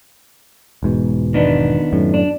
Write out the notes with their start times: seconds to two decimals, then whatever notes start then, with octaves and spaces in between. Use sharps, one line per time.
0.83 E1 G#2 B2
1.34 D#3 B3 D4
1.93 F#2 A2
2.14 D4